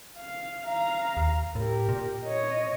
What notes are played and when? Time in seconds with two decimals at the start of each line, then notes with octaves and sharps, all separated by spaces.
0.18 F5
0.67 F5 A#5
1.17 D#2
1.55 A2 G4 A#4
1.89 A#2
2.25 C#5 D#5